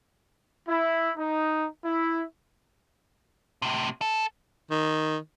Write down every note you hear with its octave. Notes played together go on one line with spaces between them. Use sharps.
E4
D#4
E4
A2 C3
A4
D#3